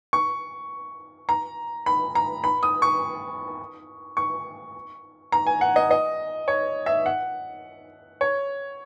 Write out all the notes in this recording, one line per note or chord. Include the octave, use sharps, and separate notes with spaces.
C#6
A#5
B5
A#5
B5
D#6
C#6
C#6
A#5
G#5
F#5
D#5
D#5
C#5
E5
F#5
C#5